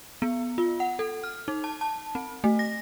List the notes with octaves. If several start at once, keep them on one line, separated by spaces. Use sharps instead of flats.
B3
F4
F#5
A4
F6
D#4
A5
A5
C4
A3
A#6